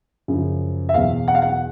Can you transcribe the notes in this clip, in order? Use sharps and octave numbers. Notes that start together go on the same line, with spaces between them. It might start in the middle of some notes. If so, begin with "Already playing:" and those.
F#2 C#3 F3
E5
E2 B2 F#3 F5
F#5
F5
F#5